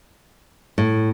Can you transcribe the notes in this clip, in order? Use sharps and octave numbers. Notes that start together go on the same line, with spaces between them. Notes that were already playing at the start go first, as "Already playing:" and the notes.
A2